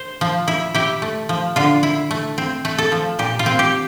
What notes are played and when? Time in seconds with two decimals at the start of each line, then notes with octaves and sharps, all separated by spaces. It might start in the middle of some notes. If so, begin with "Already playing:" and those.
Already playing: C5
0.21 F3
0.48 E4
0.74 E4 G4
1.02 A3
1.29 F3
1.56 D3 F4
1.83 E4
2.11 A3
2.38 C4
2.65 A3
2.78 A4
2.92 F3
3.19 A#2 G4
3.39 F4
3.46 C4
3.59 G4